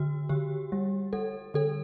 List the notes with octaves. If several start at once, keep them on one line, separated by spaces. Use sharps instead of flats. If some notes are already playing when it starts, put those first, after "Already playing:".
Already playing: D3 F#4
D3 G4
G3
G3 A4
D3 A4